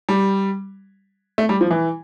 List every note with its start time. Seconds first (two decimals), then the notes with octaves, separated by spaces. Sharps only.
0.09 G3
1.38 A3
1.49 G3
1.61 F3
1.71 E3